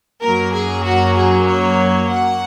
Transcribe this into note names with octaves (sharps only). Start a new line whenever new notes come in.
F#2 F#3 A#3 A#4
G#4
F#4
G#4
C#5
F#5